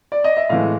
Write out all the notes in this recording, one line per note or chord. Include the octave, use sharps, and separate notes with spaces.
D5
D#5
E5
A2 E3 G#3 F5